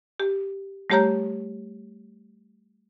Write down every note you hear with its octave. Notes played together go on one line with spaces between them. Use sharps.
G4
G3 A3 G4 C#5 A#5 G6